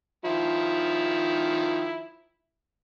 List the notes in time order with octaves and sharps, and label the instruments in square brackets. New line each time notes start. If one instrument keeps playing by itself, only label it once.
[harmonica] D#3 F3 E4